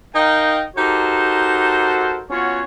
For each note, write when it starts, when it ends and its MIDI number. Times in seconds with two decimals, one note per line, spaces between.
0.15 0.63 63
0.15 0.63 70
0.15 0.63 75
0.15 0.63 77
0.15 0.63 79
0.77 2.23 63
0.77 2.23 66
0.77 2.23 67
0.77 2.23 69
0.77 2.23 70
0.77 2.23 72
2.31 2.62 59
2.31 2.62 61
2.31 2.62 65
2.31 2.62 66
2.31 2.62 73